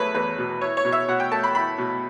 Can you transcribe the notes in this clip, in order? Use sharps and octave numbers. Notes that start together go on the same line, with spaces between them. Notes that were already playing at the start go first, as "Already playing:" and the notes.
Already playing: E2 F#3 A3 B4 C#5
E2 B4
B2
E4 C#5
C#5
B2
E5
B2 F#5
G5
A3 A5
B5
E4 B5
B2